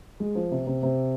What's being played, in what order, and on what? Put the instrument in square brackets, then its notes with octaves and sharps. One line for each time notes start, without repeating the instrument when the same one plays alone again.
[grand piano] G#3
F3
C3
C3
C3